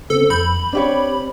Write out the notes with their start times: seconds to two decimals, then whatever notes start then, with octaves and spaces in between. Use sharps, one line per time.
0.10 C#3 B3 C4 A4
0.30 F2 B5 G6
0.73 C4 D4 G4 C#5